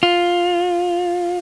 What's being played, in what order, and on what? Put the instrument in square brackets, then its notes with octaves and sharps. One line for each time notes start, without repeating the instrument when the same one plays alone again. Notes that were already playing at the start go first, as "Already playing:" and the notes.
[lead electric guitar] F4